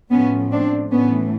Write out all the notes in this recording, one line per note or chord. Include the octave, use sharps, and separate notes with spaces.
A2 F3 A3 B3 C#4
C4 D4
A2 E3 A3 B3 C#4